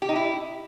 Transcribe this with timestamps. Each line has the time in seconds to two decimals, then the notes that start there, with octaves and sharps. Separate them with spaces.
0.02 G4
0.09 D#4
0.16 E4